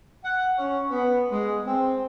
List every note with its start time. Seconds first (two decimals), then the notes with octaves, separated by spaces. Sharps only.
0.24 F#5
0.58 C#4
0.90 B3
1.30 G#3
1.66 C4